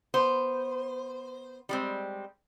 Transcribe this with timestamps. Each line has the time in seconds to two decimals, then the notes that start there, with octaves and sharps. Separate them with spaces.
0.14 B3 C5
1.69 G3 G#3 C4